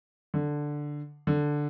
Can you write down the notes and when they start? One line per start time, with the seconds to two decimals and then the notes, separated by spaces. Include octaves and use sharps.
0.34 D3
1.27 D3